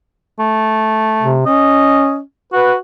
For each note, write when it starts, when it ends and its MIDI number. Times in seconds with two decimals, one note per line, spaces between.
0.40 1.36 57
1.23 1.42 48
1.46 2.20 61
1.46 2.17 75
2.52 2.76 66
2.52 2.74 71